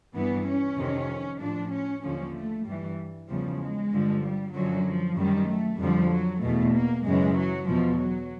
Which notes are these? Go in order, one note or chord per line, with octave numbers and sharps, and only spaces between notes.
G2 E3 B3
C#4
F2 C3 D#3
A2 F3 D4
C#4
D#2 D3 F3 C#4
A3
G2 E3 G3
E2 C#3 F3 G3
G#3
G2 D3 F3
G3
F#2 D3 F3 F#3
F3
F#2 D#3 G3
A3
F2 D3 F3 G3
F#3
E2 B2 A3
A#3
F#2 C#3 E3 G#3
F#3
E2 B2 F3
F#3